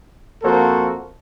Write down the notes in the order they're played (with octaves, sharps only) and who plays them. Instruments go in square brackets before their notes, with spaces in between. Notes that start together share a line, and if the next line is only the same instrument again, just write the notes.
[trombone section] F2 A#3 F#4 A4 A#4 C5